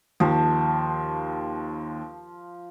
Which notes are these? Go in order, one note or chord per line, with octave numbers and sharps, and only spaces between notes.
D#2 F3